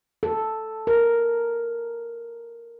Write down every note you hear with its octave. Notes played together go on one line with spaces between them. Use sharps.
A4
A#4